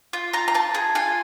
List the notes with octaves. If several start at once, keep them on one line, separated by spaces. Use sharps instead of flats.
F4
F4 A#5
A#5
F4 A5
G#4
F4 G#5